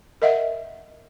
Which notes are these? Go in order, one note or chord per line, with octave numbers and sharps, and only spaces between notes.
A#4 D#5 E5 F#5